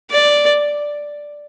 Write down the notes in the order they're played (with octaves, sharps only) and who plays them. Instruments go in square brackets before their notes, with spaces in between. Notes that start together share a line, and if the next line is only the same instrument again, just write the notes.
[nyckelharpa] D5